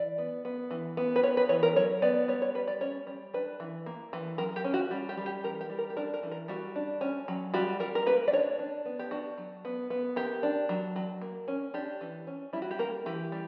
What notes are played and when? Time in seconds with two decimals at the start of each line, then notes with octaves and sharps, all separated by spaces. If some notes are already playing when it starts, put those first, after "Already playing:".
Already playing: E3 D5
0.18 B3
0.45 B3
0.71 E3
0.97 B3
1.16 B4
1.23 B3 C#5
1.37 B4
1.49 E3 C#5
1.63 A#4
1.76 F#3 C#5
2.02 B3 D5
2.28 G3 C#5
2.42 C#5
2.55 G3 B4
2.67 D5
2.81 C#4 C#5
3.07 G3
3.34 D4 B4
3.60 E3
3.86 A#3
4.13 E3
4.38 F#3 A#4
4.56 G4
4.64 C#4
4.74 F#4
4.91 G3
5.09 G4
5.17 G3
5.26 G4
5.44 E3 A#4
5.61 G4
5.70 G3
5.78 A#4
5.90 G4
5.97 D4 A#4
6.14 A#4
6.23 E3
6.32 A#4
6.48 G3 F#4
6.76 D4
7.01 C#4
7.28 F#3
7.54 G3 F#4
7.80 G3 A#4
7.95 A#4
8.06 A#3 B4
8.28 D5
8.33 D4 C#5
8.59 D4
8.86 B3
8.99 G4
9.11 D4 F#4
9.38 F#3
9.65 B3
9.90 B3
10.16 A#3 G4
10.43 D4
10.69 F#3
10.96 F#3
11.22 A#3
11.48 C#4
11.74 D4 G4
12.01 E3
12.27 C#4
12.53 G3 E4
12.62 F#4
12.71 G4
12.79 A#3 A#4
13.06 E3 G4
13.32 G3